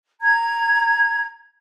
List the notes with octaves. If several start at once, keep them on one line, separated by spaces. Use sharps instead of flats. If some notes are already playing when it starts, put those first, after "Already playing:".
A#5 G#6